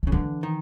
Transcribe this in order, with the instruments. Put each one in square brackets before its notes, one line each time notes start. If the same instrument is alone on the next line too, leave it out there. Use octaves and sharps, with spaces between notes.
[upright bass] D#3
[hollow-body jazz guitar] C#3
[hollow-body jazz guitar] D3 [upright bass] E3
[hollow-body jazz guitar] D#3